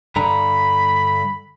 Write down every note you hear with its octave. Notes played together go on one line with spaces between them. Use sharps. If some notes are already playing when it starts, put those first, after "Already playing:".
G2 D3 A#5 B5